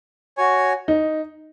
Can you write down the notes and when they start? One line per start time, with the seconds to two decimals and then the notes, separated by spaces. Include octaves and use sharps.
0.38 F#4 C#5 G#5
0.88 D#4